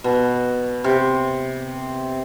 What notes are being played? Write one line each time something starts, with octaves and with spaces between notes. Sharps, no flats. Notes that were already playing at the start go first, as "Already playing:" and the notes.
B2
C3